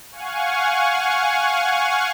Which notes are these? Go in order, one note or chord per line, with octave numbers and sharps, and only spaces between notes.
F5 F#5 G#5 C#6